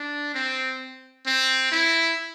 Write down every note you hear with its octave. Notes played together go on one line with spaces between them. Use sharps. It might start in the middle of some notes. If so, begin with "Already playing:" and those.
Already playing: D4
C4
C4
E4